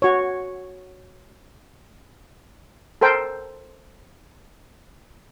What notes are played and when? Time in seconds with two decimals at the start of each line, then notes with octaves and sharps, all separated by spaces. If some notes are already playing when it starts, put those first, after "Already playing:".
0.02 F#4 C#5
3.01 A4 A#4 C5 G5